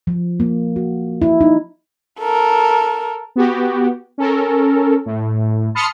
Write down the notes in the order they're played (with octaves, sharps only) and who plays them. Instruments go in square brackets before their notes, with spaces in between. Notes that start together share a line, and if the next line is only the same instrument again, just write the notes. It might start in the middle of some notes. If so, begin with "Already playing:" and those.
[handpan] F3
A#3
F#4
E4
D#4
[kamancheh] A4 A#4
[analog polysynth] B3 F#4 G4
C#4 A4 A#4
A2
A5 B5 C6 D#6 F6 C#7